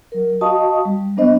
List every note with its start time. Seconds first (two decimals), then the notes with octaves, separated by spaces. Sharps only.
0.12 F#3 A#4
0.41 F#4 D#5 F5 A5 C#6 D#6
0.85 G3
1.17 F#3 A#3 B3 D4 C5 D#5